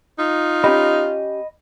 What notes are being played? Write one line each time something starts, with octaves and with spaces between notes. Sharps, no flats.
D#4 F4
C#4 G4 D#5 B5